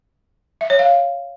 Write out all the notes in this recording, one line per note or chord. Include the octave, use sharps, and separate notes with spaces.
E5
C#5
F5